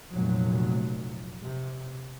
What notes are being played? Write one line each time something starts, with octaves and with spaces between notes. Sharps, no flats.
F1 A#2 F#3
C3